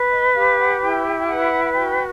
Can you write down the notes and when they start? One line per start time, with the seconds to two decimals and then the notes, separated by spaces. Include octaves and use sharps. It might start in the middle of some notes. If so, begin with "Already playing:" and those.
Already playing: B4
0.11 D#5
0.35 G4 F5
0.59 F#5
0.81 E4 G5
1.17 G5
1.28 B4 F#5
1.64 F#5
1.74 F#4 G5